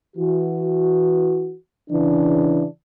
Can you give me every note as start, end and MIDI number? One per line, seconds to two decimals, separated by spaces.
0.17 1.55 52
0.17 1.55 66
1.90 2.64 49
1.90 2.64 52
1.90 2.64 62